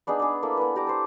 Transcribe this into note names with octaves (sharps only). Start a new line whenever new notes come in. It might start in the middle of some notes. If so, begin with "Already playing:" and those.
B3 D4 D#4 G#4
D4 G#4
A#3 E4 A4
B3 E4 B4
G4 A#5 D6
A4 C5